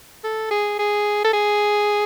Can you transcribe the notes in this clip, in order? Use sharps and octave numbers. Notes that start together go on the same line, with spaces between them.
A4
G#4
G#4
A4
G#4